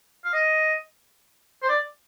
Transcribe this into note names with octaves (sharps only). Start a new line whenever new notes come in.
F5
D#5
C5
D5